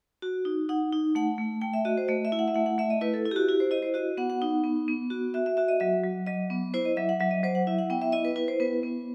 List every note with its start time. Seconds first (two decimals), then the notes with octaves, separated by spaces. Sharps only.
0.22 F#4
0.45 D#4
0.69 D#4 F#5
0.92 D#4
1.15 A3 F#5
1.38 A3
1.61 A3 G5
1.73 E5
1.85 F#4 D#5
1.98 C5
2.08 A3 D#5
2.25 E5
2.32 E4
2.39 F#5
2.48 E5
2.54 A3 F#5
2.66 F#5
2.78 A3 E5
2.90 D#5
3.01 E4 B4
3.14 A4
3.25 E4
3.31 G4
3.36 F#4
3.48 E4 G4
3.60 C5
3.71 E4 D#5
3.82 C5
3.94 F#4 D#5
4.17 B3 F#5
4.30 F#5
4.42 D#4
4.64 B3
4.88 B3
5.10 F#4
5.34 F#4 E5
5.46 E5
5.57 F#4 E5
5.68 D#5
5.80 F#3 E5
6.04 F#3
6.26 F#3 D#5
6.50 B3
6.74 E4 C5
6.85 D#5
6.97 F#3 E5
7.09 F#5
7.20 F#3 E5
7.31 D#5
7.43 F#3 C5
7.55 F#5
7.67 E4 E5
7.78 F#5
7.90 B3 G5
8.01 E5
8.12 E4 D#5
8.25 B4
8.36 E4 B4
8.48 C5
8.60 B3 B4
8.83 B3